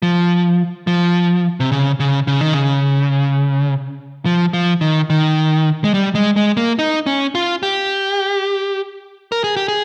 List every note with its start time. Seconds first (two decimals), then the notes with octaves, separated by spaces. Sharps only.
0.02 F3
0.87 F3
1.60 C3
1.72 C#3
2.00 C#3
2.27 C#3
2.41 D#3
2.53 C#3
4.26 F3
4.53 F3
4.81 D#3
5.10 D#3
5.84 G#3
5.94 G3
6.15 G#3
6.36 G#3
6.57 A#3
6.79 D#4
7.06 C#4
7.35 F4
7.63 G4
9.32 A#4
9.44 G#4
9.56 G4
9.68 G#4